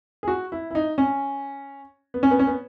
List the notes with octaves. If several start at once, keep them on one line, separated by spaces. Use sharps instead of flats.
G#4
F#4
E4
E4
D#4
C#4
B3
C#4
B3
C#4
B3